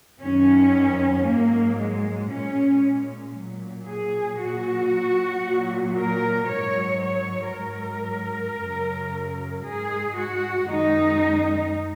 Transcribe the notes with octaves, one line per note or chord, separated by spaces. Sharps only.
F#2 D#3 F#3 C#4
G#2 F#3 A#3
G#3
A#2 G#3 C#4
A#2 F#3
G#4
A#2 F#3 F#4
A#2 F#3
A#4
G#2 F#3 C#5
C#5
G#2 F#3 A#4
F#2 C#3 F#3
G#2 G#3 G#4
F#4
F#2 D#3 G#3 D#4